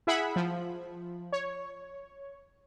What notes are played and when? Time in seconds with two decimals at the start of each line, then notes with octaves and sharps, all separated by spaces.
0.07 E4 G#4 E5 F#5 B5
0.36 F3
1.32 C#5